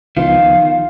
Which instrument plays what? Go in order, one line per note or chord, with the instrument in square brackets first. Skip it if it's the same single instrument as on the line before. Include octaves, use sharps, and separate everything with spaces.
[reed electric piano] C#2 F3 B3 [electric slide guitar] D#3 [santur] F4 [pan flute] F5